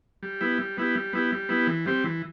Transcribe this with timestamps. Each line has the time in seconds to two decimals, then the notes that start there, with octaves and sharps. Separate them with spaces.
0.23 G3
0.41 B3 E4 G4
0.59 G3
0.77 B3 E4 G4
0.95 G3
1.13 B3 E4 G4
1.32 G3
1.49 B3 E4 G4
1.67 E3
1.86 G3 C4 G4
2.04 E3